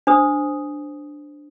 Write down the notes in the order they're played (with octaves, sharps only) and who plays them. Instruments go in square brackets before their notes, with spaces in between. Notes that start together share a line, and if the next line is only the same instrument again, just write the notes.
[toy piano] D4 C5 D#6